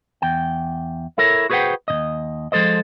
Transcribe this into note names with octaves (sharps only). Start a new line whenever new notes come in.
E2 G5
E4 A4 A#4 C#5
F#4 G#4 B4 C5 F#5 G5
D#2 C3 D#5
F3 G#3 A4 C5 D#5